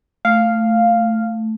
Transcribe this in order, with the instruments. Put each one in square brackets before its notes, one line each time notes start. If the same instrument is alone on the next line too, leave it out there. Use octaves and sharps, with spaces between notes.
[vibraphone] A3 [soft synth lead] F5